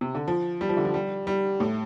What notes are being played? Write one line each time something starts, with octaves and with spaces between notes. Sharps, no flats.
C3
D3
F3
G3
F3
D3
F3
G3
G3
A2